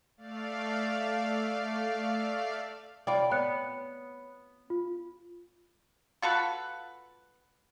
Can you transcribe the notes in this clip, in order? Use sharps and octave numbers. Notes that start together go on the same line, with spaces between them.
A3 D5 F5
C3 F4 D5 G5 B5
B3 C#5 F#6 C#7
F4
F4 F#4 A4 B4